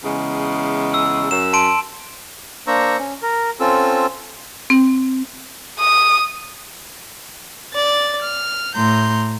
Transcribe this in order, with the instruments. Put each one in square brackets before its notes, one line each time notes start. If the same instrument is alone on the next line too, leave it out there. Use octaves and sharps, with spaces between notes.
[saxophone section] E2 C#3 G#3
[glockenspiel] E6
[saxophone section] F#2 [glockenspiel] E7
[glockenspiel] A5 C6 D7
[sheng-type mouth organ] A#3 D4 C5 A#5 C#6 E6
C#4
A#4
C4 C#4 F4 A4 E6
[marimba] C4
[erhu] D#6
[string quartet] D5 A6
F6
A2 A#5 C6 G6